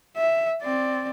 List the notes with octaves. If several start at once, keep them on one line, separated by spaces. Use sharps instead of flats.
E5
C4 D5